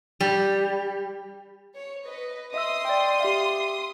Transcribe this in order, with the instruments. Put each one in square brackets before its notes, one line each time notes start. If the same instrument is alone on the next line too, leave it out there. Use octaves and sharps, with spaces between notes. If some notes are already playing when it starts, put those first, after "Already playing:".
[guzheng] G3
[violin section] C#5
B4 D#5
[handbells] D#5 E5 E6 [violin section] C6 D#6
[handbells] D5 G5
G4 E5 F5